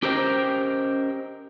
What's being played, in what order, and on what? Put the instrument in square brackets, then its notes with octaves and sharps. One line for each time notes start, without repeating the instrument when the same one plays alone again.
[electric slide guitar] C#4 G4 A#4 C5 D#5 G5